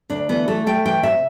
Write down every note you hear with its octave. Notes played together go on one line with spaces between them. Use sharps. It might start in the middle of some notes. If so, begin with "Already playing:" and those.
D2 D4
E3 B3
A3 A4
A3 G5
E3 G5
C3 E5